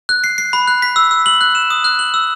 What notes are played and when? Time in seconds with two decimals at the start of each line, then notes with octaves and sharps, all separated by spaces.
0.09 F#6
0.24 C7
0.38 C7
0.53 B5
0.67 F#6
0.82 B6
0.96 E6
1.11 E6
1.26 F#7
1.41 F#6
1.55 E7
1.70 D#6
1.84 F#6
1.99 F#7
2.14 E6